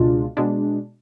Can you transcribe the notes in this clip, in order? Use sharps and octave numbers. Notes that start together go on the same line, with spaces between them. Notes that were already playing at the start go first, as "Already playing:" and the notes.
Already playing: C#2 B2 G#3 D4 F4
B2 G#3 D4